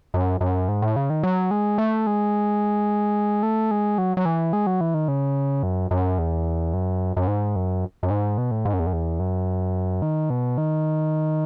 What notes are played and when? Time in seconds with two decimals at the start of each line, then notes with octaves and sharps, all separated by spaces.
0.14 F#2
0.41 F#2
0.68 G#2
0.82 A2
0.96 C#3
1.10 D#3
1.23 F#3
1.51 G#3
1.78 A3
2.07 G#3
3.43 A3
3.71 G#3
3.98 F#3
4.17 F#3
4.25 E3
4.53 G#3
4.67 F#3
4.81 E3
4.94 D#3
5.08 C#3
5.63 F#2
5.91 F#2
6.19 E2
6.74 F#2
7.17 F#2
7.27 G#2
7.56 F#2
8.03 F#2
8.11 G#2
8.38 B2
8.51 A2
8.65 G#2
8.73 F#2
8.80 E2
8.87 F#2
8.93 E2
9.20 F#2
10.02 D#3
10.30 B2
10.58 D#3